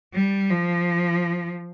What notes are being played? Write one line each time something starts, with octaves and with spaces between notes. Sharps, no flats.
G3
F3